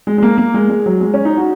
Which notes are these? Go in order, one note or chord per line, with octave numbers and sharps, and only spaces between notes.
G#3
G#3
A#3
A#3
G#3
G#3
F#3
G#3
C#4
D#4
F#4